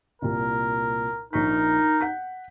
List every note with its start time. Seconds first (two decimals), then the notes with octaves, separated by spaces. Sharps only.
0.22 C2 A#2 A#4
1.33 A#1 D#4 A#4 C#6 B6
2.01 F#5 G6 B6